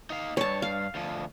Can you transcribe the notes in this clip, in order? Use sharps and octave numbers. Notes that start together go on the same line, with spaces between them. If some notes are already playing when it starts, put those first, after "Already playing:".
D#4 F5
G2 C#5 A5
F5
D2 F3